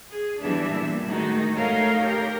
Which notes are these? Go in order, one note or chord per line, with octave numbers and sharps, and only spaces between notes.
G#4
E3 G3 B3 D4 E5
A#2
D#3 G#3 A3 D#4 F#4
A3 D#4 A#4 C#5 F5
G4 A#4